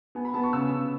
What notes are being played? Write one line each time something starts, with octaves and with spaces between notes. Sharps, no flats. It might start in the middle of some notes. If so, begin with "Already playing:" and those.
B3 G#5
B5
B3 A5
C#6
C#3 E6
C#3